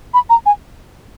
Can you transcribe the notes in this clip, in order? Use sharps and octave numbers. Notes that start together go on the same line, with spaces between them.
B5
A#5
G#5